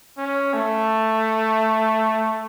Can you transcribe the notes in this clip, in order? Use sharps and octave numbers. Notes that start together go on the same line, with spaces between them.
C#4
A3